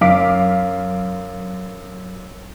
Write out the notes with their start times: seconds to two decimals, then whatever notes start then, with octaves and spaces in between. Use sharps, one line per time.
0.01 F#2 F5 D6 B6